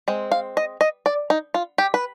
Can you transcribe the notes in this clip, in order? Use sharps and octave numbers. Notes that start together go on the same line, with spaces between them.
G#3 C4
F5
D#5
D#5
D5
D#4
F4
G4
B4